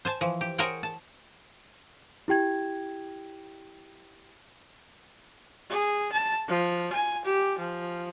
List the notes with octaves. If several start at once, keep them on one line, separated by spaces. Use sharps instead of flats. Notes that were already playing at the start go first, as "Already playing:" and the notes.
C5 G#5 A5
E3 F3
G4
G#4 A#4 C5 C#5 F#5 G5
A5
E4 G4 G5 G#6
G#4
A5
F3
G#5
G4
F3